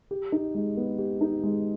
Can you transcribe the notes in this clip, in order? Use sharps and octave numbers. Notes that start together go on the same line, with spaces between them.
G4
D#4
G#3
B3
G4
D#4
G#3